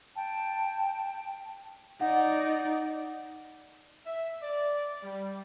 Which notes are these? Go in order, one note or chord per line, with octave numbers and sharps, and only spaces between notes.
G5 A5
D#4 D5 F#5
E5
D5
G3